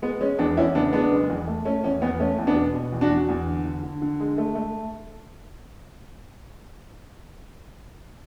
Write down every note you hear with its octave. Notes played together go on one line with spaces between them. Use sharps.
G#3 B3
G#3 C#4
E2 B3 D4
E2 C#4 E4
C#3 B3 D4
G#3 B3 D4
F#1
E2
A3
A3 C#4
E2 C#4
E2 B3
A3 C#4
E2
B3 D4
B2
B2
E2
D4 F#4
E2
E2
D3
D3
D3
D3
G#3
A3
A3